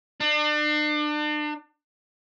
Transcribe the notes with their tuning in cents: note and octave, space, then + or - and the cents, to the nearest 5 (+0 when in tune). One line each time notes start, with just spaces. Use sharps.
D4 +35